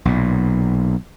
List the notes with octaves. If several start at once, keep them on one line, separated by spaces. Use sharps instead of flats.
B1 A#2